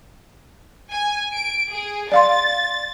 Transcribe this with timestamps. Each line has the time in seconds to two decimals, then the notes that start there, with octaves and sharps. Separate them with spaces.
0.93 G#5
1.33 D7
1.71 G#4
2.12 D5 F5 C6 A6